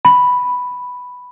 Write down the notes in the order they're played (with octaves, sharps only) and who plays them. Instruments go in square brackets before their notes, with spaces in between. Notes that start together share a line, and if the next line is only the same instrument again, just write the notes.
[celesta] B5